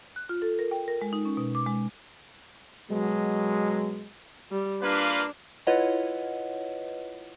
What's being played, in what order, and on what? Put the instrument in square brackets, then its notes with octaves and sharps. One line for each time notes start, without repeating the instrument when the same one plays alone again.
[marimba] F#6
F4
A4
A#4
G5
A#4
G#3
D#4
C#4
B2
D6
G#3
[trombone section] B2 F#3 G#3
[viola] G3
[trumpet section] A#3 F4 B4 [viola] D4
[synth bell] E4 F4 B4 C#5 D#5 F#5